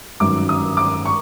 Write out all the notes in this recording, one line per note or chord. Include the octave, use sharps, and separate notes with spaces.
G1 F#2 D#3 D6
D#6
D6
C#6